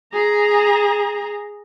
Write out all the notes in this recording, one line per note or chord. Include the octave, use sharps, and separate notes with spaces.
G#4 A#5